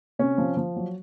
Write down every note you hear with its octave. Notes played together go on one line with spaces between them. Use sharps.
C3 C#4
F3
F3
F#3